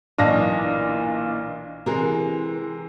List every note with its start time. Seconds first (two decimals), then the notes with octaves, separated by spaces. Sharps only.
0.18 B1 A#2 E3 D4 D#5 F5 A#6
1.86 C3 E3 G#3 A#4